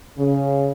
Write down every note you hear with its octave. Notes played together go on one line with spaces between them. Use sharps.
C#3